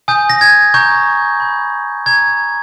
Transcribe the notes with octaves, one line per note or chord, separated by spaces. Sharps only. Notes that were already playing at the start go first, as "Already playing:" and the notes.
G#5 D#6 G6
A#6
G#6
A#5 C#6 G6
B5 G6
A#5 C#6 G6 G#6